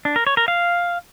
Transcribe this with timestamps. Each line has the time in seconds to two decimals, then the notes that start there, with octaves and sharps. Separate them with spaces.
0.05 D4
0.16 A#4
0.27 C#5
0.37 A#4
0.48 F5